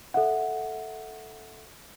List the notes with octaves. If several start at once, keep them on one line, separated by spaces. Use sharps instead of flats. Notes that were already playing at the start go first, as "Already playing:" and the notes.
A4 E5 F#5